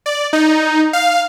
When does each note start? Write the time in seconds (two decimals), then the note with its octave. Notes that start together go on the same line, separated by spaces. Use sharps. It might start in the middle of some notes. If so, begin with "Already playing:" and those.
0.06 D5
0.33 D#4
0.93 F5